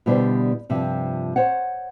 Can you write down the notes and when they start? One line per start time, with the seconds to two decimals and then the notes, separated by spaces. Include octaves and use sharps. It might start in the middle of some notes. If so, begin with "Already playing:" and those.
0.06 B2 D3 G3 B3 E4 C5
0.69 G2 C3 F3
1.36 C5 C#5 F#5